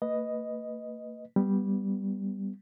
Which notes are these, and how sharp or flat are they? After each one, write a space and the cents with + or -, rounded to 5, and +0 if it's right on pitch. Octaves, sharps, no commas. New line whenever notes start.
A#3 -40 B4 +0 D#5 +0
G3 +0 B3 +0